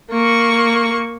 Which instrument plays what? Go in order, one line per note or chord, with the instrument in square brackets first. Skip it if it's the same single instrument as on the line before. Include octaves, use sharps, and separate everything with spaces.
[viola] A#3 C#6